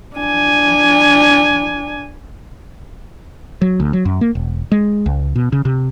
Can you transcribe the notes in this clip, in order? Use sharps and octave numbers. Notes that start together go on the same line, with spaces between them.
D4 G#5
F#3
D2
F#3
F#2
A#3
E1
G#3
C#2
B2
C#3
C3